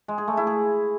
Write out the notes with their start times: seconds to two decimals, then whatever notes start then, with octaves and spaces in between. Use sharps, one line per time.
0.08 G#3
0.18 G#4
0.28 A3
0.37 E4
0.47 G#4